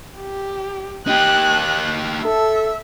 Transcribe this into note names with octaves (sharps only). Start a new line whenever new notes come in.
G4
D#4 G4 F#6
A4 E5